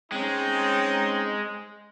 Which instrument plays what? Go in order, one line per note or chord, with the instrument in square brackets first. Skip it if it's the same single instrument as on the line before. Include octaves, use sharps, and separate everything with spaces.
[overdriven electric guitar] G#3 [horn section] C4 C#4 D#4